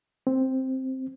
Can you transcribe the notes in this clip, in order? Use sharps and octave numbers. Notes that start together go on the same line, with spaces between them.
C4